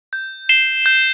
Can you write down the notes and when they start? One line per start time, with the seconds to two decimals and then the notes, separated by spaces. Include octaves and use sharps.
0.13 G6
0.49 C7 E7 G7
0.86 G6